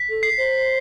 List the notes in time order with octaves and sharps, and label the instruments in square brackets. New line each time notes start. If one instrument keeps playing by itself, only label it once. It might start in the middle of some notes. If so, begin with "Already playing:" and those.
Already playing: [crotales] B6
[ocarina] A4
[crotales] C7
[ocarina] C5